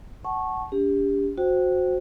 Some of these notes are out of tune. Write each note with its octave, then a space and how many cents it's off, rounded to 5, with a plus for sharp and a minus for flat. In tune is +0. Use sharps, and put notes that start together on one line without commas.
F#5 +20 A5 -20 C#6 -15
D4 -45 G4 +25
F#4 -15 C5 +0 G5 -25